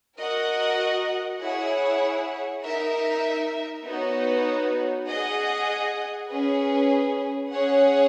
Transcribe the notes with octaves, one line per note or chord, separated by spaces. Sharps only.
F#4 A#4 D#5 F#5
E4 G#4 C#5 F#5
D#4 A#4 E5
B3 D#4 F#4 C#5
G#4 D#5 F#5
C#4 G#4 B4
C#4 G#4 C#5 F#5